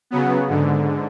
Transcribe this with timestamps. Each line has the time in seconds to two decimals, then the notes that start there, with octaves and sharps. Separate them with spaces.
0.11 C#3 F#3 B3
0.49 G#2 D3